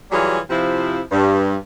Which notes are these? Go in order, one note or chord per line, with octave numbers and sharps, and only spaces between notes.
E3 F#3 G3 F4 G#4 C#5
C3 F3 E4
G2